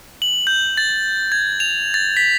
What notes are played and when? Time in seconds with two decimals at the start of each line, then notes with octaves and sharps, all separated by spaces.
0.22 F#7
0.47 G6
0.77 A6
1.32 G#6
1.60 F7
1.94 A6
2.17 B6